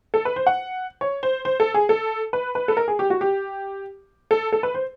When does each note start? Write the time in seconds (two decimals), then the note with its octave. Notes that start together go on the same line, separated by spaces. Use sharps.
0.14 A4
0.25 B4
0.36 C5
0.47 F#5
1.01 C#5
1.23 C5
1.45 C5
1.60 A4
1.74 G#4
1.89 A4
2.33 B4
2.55 B4
2.68 A4
2.77 A#4
2.88 G#4
2.99 G4
3.10 F#4
3.21 G4
4.31 A4
4.52 A4
4.63 B4
4.74 C5